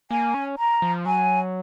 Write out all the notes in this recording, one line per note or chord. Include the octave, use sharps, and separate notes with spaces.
A#3 G#5
C#4
A#5
F3
F#3 G#5